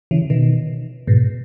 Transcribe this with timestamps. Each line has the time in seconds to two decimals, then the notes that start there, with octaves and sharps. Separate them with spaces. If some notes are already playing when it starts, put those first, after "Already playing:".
0.11 C#3 E3
0.30 B2 D#3
1.07 G#2 B2